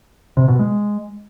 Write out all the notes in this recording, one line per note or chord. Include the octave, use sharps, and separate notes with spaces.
C3
B2
G#3